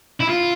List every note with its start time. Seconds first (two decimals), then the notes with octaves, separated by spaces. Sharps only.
0.21 E4
0.29 F4